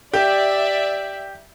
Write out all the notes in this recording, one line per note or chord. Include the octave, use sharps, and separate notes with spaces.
G4 D5 E5